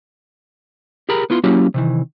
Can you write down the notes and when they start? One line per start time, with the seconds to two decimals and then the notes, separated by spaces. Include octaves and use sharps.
1.09 G4 G#4 A#4 A#5 B5
1.30 B3 E4 F4 C6
1.44 F#3 A#3 C#4 E4 F#4 G4
1.74 C3 D#3 E3